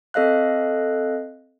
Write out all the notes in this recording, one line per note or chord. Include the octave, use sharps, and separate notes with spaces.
C4 A4 D#5 F5 F#6